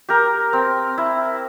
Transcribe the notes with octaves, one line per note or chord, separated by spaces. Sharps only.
G4 A#4
C4
E4